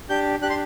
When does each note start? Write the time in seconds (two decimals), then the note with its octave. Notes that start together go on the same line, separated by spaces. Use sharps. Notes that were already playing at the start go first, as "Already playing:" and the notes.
0.09 D4 G4 G6
0.42 D4 G4 F#6
0.50 C6